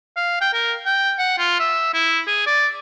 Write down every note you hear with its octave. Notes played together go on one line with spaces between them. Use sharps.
F5
G5
A#4
G5
F#5
F4
E5
E4
G#4
D5